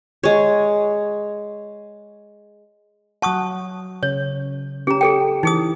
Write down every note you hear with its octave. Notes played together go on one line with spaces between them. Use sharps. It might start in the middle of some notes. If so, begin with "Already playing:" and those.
G#3 C#5
F#3 F#5 A5 C#6 D#6
C#3 C#5
C#4 G4 G#4 A#5
G#4 A4 G5
E3 D#4 G#4 D#6